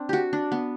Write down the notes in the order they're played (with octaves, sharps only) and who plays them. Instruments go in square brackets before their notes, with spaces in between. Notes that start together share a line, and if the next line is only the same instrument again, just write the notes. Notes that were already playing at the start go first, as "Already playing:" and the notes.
Already playing: [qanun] C4 D4
F#4 G4
D4
B3